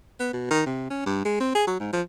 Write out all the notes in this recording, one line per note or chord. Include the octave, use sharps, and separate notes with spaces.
B3
B2
D#3
C3
C#4
G2
G#3
C4
G#4
F#3
G#2
F3